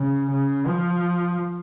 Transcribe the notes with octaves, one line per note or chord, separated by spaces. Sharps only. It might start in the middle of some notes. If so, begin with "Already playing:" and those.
Already playing: C#3
C#3
F3